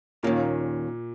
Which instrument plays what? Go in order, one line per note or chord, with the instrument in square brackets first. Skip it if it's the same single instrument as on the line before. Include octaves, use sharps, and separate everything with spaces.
[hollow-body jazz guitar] D#2 D#3 A#3 C#4 [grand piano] A#2